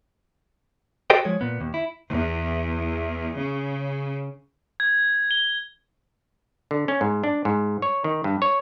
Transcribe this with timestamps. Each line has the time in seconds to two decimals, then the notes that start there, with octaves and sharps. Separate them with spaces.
1.10 F#4 G4 A4 C5 D#5 G5
1.25 F3 G#3 C#5
1.41 A#2 B3
1.61 D#2
1.74 E4
2.11 E2
3.38 C#3
4.80 G#6
5.31 G7
6.71 D3
6.88 C#4
7.01 G#2
7.24 D4
7.45 G#2
7.82 C#5
8.04 D#3
8.24 G2
8.42 C#5